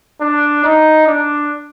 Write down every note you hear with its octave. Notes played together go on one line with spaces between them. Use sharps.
D4
D#4
D4